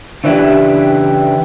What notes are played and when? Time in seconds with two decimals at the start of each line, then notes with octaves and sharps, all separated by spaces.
0.24 C#3 E3 D4 E4 G4